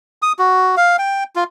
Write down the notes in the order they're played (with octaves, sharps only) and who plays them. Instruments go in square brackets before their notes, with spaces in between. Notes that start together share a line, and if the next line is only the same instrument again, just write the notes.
[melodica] D#6
F#4
F5
G5
F4